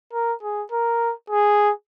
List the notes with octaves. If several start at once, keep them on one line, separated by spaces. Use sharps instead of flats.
A#4
G#4
A#4
G#4